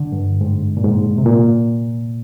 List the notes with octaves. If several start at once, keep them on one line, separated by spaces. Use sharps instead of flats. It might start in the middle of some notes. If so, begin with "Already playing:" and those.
Already playing: D3
G2
G#2
A#2
G#2
C3
A#2